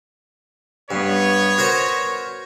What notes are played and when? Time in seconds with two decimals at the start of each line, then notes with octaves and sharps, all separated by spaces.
0.91 G2 B3 C#5
1.58 F#4 A#4 C5